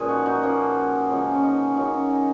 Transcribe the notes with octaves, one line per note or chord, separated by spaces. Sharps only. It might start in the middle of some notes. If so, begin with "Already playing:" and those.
Already playing: A#2 F3 G#3 C#4 G#4 B4
D#4 F#4
D#4 F#4
F3 A#3 C#4
C#3 F3 G#3 C#4
C#4
D#4
C#4
C#3 F#3 A#3 D#4
C#4
D#4